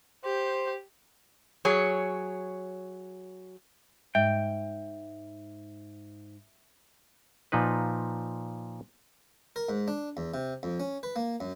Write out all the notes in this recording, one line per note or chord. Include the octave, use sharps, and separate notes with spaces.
G4 C5
F#3 G#4 C#5
G#2 E5 G5
A#2 F3 D#4 B4
A#4
G#2
D4
E2
C3
F2
C#4
B4
A#3
F#2